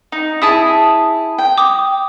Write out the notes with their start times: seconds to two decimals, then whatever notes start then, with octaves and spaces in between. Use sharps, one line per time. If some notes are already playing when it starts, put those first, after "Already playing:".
0.12 D#4
0.42 E4 G#4 A5 D#6
1.38 G5
1.57 D6 D#6